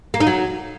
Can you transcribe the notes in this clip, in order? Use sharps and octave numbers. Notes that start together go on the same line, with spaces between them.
A#3
D#4
F#3